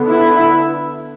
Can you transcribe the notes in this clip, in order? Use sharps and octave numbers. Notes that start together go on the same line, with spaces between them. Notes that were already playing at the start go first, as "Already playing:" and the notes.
Already playing: D3 B3
E4